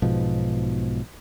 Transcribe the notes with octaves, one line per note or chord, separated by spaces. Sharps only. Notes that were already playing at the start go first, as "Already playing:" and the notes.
B1 G#2 B2 F3